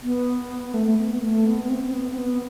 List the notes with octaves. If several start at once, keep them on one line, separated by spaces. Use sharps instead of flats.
B3
A3
A3
B3
B3
A3
B3
B3
C4
C4
B3
C4
B3